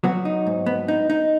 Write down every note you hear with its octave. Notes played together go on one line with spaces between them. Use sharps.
F#3 B3 F#4
D#4
G#2
B3
D#4
D#4